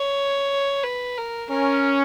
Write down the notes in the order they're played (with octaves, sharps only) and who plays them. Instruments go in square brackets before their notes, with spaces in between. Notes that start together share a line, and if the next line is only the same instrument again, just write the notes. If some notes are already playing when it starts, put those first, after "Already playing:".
Already playing: [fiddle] C#5
B4
A#4
[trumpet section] C#4 [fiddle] A#4